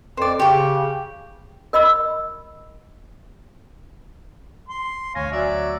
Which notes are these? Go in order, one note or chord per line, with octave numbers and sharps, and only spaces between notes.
F2 C5 D5
C#3 G4 C#6
A#4 D#5 B5 E6
C6
A1 D2 C#5 F5 G#5 A#6
F#3 D5 E5